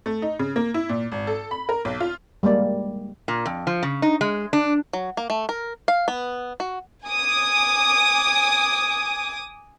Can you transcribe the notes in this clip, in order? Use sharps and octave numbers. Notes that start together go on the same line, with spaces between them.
A3
D#4
C#3
A#3
E4
A#2
G#1
A4
B5
A#4
B1
F4
G3 G#3 A#3 D5
A#2
F2
F3
C#3
D#4
G#3
D4
F#3
A#3
A3
A#4
F5
B3
F#4
G#5 D6 D#6